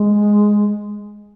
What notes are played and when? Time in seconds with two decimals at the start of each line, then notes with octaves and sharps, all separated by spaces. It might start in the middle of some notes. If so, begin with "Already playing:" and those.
Already playing: G#3